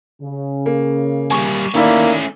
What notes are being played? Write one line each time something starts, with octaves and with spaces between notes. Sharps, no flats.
C#3
A#3
G3 A#3 G#5 C#6
D#3 A3 A#3 C#4 E4 D5